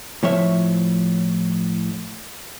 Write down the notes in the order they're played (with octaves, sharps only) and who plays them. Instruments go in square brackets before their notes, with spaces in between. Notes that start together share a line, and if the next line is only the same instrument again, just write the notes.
[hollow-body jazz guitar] A2 F3 C#5 E5